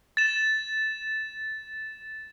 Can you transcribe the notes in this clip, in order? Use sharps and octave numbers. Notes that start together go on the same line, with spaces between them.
A6 E7